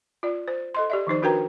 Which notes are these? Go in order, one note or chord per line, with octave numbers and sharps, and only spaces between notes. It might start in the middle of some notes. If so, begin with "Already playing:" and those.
F4 D5
C5
A4 D#5 C6
G4 D5 E5
D#3 F3 D#4 C5
D4 F#4 A#4 B4 G5 A#5